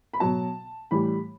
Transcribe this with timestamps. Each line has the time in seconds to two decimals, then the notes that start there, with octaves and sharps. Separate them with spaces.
0.13 B5
0.20 B2 F#3 A5
0.91 A2 E3 G3 B5